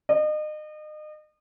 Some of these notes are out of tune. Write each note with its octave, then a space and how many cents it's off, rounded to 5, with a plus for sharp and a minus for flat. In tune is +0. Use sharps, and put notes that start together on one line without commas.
D#5 -35